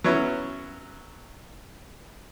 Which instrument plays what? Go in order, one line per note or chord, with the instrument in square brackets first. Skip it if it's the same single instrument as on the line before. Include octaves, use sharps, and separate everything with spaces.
[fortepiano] F#3 B3 C#4 E4